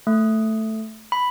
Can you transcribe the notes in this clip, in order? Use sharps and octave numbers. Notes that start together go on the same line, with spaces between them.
A3
B5